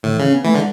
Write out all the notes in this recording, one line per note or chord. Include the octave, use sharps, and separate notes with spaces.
A2 D3
E3
C#3 C#4
B3
E3 A3
D3 G#3